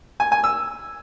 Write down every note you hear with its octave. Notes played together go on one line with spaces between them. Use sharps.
G#5
G#5
E6